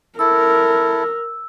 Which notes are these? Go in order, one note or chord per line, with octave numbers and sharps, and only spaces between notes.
E4 A4 A#4 E6